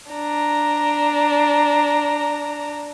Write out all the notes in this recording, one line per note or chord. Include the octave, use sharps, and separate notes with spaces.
D4 A#5